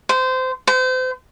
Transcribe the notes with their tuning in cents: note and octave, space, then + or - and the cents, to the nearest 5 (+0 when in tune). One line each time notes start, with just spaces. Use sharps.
C5 -20
C5 -35